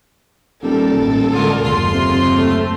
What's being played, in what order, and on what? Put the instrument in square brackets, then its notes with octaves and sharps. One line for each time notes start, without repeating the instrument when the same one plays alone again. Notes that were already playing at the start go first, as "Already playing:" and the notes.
[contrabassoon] D#1 [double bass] G3 [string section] A4 [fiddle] A#4
[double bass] A1
[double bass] D3 G#3 [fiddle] F4 A#4
[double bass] F#1 D#2 [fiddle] F4 C6
[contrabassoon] C3
[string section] A3 C4